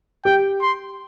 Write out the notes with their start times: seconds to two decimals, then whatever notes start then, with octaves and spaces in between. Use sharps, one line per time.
0.25 G4 G5
0.62 C6